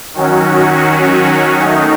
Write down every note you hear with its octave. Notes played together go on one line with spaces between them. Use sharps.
D#3 F#3 C#4 F#4
D#3 A3 D#4